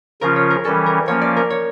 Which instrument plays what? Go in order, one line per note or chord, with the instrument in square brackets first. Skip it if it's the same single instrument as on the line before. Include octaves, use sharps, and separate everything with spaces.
[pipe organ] C#3 F3 C#4 F4 [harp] A#4
[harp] C#5
A#4
[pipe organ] E3 G3 C#4 [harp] A4
[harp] A#4
[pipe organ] F3 A#3 C#4 [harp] C#5
[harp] D5
A#4
C#5